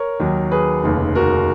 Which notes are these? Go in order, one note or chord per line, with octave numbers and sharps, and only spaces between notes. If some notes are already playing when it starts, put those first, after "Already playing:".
Already playing: A#4 C#5
D#2 D#3 F#3
G#4 B4
F1 D#2 C#3
F#4 A#4